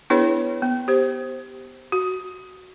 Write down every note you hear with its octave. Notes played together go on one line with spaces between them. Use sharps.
B3 D4 E4 G#4 B4 C#5
B3
G4 C5
F#4